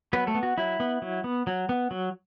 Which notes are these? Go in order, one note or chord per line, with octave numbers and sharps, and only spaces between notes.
F#3 B3 B4
A3 A4
B3
F#4
F#3 E4
B3
F#3
B3
F#3
B3
F#3